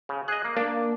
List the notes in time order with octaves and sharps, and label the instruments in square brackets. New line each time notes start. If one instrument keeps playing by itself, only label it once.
[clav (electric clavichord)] C#3
[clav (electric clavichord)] G#4 D#5 [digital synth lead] F#6
[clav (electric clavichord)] A#3
[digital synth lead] A#3 [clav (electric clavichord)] D4